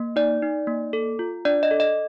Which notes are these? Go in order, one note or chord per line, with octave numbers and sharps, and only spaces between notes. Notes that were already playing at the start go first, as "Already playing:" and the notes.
Already playing: A#3
D#4 D5
D#4
A#3
A4
F4
D4 D5
D#5
A4
D#5